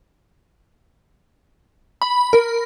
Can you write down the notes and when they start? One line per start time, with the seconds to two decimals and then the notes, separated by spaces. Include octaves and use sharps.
2.02 B5
2.33 A#4